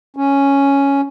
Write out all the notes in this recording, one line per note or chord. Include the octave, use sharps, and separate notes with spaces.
C#4